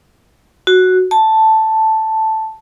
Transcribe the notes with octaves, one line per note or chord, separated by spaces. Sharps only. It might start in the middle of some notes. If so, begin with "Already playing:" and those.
F#4
A5